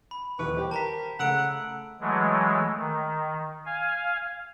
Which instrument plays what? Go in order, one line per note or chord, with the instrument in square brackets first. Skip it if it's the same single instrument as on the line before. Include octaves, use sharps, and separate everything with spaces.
[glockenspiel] B5
[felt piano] D#1 E3 C#6 [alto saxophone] B4
[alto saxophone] G4 [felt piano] C5 G5
[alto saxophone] A#4 [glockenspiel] A5 A#5 B6
[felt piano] C#3 A3 [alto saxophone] F#5 [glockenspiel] A#5 E6 D7
[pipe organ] E3 F#3 G#3 A3
D#3
F5 G#5